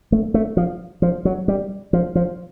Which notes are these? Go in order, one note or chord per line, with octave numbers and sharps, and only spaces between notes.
A3
A3
F3
F3
F#3
G3
F3
F3